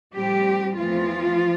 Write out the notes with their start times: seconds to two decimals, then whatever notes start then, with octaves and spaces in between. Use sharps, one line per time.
0.15 A2 F3 G3 C4 G4
0.78 E2 E3 F3 A3 C4 F4